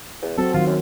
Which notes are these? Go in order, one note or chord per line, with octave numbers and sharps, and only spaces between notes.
E2
F#3 C4 F#4 A4
D#3 F#3 F4
F#2